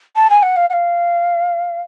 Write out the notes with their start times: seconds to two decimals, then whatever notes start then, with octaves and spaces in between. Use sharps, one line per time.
0.16 A5
0.30 G#5
0.42 F#5
0.56 F5
0.70 F#5
0.73 F5